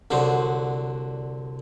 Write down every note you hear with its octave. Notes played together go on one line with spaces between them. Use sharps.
C2 D3 F#3 C5